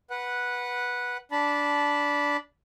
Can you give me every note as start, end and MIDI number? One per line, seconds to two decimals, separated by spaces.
0.10 1.17 71
0.10 1.17 78
1.31 2.37 62
1.31 2.37 81
1.31 2.37 83